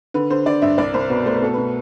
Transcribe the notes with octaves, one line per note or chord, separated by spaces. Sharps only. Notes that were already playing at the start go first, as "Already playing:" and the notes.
D3 B4
D3 C5
D3 D5
G2 E5
C2 D5
C2 C5
B2 B4
A3 C5
B4
B2 A4
B2 B4